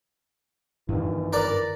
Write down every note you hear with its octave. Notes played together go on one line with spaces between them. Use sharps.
G2 D#3 E3
A#4 B4 D5